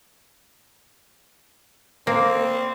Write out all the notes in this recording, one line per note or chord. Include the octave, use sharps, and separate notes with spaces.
A#3 C4